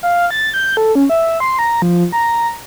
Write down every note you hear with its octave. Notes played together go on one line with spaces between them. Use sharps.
F5
A6
G6
A4
C#4
E5
C6
A#5
F3
A#5